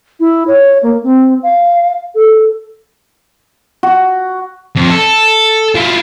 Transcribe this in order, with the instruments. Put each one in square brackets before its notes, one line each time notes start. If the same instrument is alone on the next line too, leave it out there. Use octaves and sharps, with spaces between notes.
[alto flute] E4
C#5
A#3
C4
F5
A4
[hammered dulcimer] F#4
[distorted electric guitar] F2
A4
E4 F4